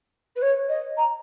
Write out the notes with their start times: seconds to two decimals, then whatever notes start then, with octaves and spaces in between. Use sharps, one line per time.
0.35 B4
0.41 C#5
0.68 D#5
0.96 A#5